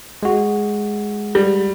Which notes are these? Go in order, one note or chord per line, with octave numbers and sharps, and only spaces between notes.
G#3 F#4
G3